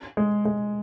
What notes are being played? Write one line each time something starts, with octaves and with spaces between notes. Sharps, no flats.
G#3
G#3